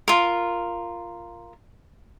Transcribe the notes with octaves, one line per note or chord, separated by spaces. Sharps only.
F4 A#4